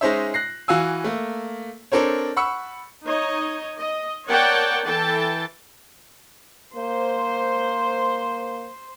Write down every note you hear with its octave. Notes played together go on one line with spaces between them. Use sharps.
G#3 C#4 D#4 C5 C#5 E5
F#6 A#6 C7
E3 F#4 F5 G#5 E6
A3 A#3
C4 D4 A4 A#4 C5 C#5
F#5 B5 C#6 E6 C#7
D#4 C#5 D#5
D#5
A#4 C#5 D5 F#5 G5 A5
E3 A4 G5 A5
A#3 C5